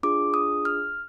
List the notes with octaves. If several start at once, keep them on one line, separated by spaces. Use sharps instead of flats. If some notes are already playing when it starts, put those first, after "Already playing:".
D4 F4 G#4 D6
D#6
F6